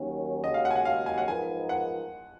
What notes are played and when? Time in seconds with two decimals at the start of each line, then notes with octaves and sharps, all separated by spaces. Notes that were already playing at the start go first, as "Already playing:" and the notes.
Already playing: D#2 D#3 F#3 C#4
0.43 D#2 C#3 G#3 C#4 F#4 D#5
0.54 F5
0.65 F#5
0.71 G#5
0.76 F#5
0.85 F5
1.06 G#5
1.18 F#5
1.27 G#2 F3 B3 D#4 A#4 G#5
1.69 F#5